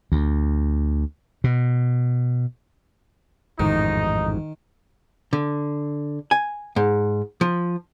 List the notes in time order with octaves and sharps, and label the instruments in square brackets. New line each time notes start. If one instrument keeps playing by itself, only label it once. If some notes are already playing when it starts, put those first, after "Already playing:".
[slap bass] D2
B2
[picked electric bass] A1 F2 G#2 [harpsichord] D#3 [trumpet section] D#4
[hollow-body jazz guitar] D3
G#5
G#2
F3